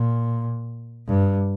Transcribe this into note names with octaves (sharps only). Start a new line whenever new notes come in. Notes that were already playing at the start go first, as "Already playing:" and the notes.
Already playing: A#2
G2